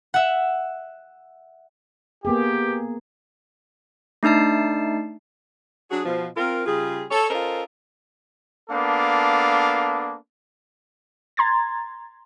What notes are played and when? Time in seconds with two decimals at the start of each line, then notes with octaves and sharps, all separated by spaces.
0.14 E5 F#5
2.25 A#3 B3 G4 G#4
4.23 A3 D4 D#4 A5 C7
5.91 F#3 D4 F#4 G#4
6.06 B2 F3
6.37 C4 F4 A#4
6.66 C#3 G3 F4 G#4
7.11 A4 C#5
7.30 C#4 F4 A4 A#4 C5 D#5
8.69 A#3 B3 D4 A4 F5
11.37 A#5 C6 G#6 A6